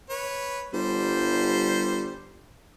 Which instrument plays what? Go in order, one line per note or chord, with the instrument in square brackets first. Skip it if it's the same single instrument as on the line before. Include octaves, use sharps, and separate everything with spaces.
[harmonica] B4 C#5
[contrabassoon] G1 [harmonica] G3 C5